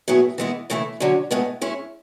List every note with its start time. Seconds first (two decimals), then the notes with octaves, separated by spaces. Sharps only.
0.08 A2 F#3 B3 E4 G#4
0.38 E3 G#3 B3 E4
0.70 C#3 E3 A3 E4
1.00 D3 F#3 C#4
1.31 A2 G#3 B3
1.61 G#3 C#4 E4